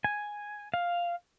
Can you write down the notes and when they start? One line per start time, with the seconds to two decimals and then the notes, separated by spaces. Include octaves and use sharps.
0.04 G#5
0.74 F5